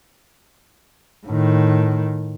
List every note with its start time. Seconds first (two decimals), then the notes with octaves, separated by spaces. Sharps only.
1.26 A2 D#3